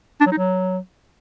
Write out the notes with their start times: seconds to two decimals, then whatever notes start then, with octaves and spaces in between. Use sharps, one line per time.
0.21 D4
0.26 F#3
0.32 D#4
0.37 F#3